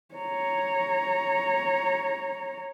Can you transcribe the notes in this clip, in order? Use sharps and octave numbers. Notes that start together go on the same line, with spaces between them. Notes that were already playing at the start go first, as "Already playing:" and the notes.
C#5 A#5